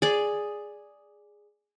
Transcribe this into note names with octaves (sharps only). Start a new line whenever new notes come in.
G#4 D5